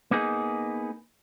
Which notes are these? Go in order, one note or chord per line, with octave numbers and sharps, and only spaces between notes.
A#3 B3 D#4 G#4